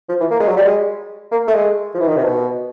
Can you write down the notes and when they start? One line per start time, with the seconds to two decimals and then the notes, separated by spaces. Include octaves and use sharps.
0.09 F3
0.20 E3
0.31 A#3
0.40 G#3
0.48 F#3
0.57 G3
0.65 G#3
1.32 A#3
1.48 A3
1.54 G#3
1.94 F3
2.00 E3
2.08 D#3
2.16 C3
2.24 B2